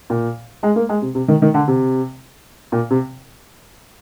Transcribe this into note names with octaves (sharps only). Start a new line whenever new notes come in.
A#2
G#3
A#3
G#3
C3
C3
D#3
D#3
D3
C3
A#2
C3